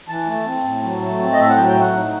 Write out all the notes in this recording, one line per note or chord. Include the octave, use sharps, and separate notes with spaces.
E3 A5
A3
C4
A2
F#3
A3
C4
D#5
A2 E5
F#5
F#3 G5
G5
A3
F#5
D#4